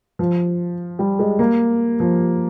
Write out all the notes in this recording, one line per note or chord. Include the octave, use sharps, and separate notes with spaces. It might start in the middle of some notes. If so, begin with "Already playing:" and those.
F3
G3
G#3
A#3
F3